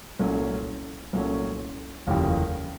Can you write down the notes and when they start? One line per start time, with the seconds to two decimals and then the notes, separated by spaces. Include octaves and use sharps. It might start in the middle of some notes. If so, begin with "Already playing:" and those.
0.19 C2 A#2 F#3 A3 C#4
1.13 C2 A#2 F#3 A3 C#4
2.07 F1 D#2 C#3 E3 G3